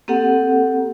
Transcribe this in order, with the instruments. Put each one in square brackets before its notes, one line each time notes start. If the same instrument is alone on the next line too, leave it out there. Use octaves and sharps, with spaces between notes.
[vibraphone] A#3 C4 G4 A4 F#5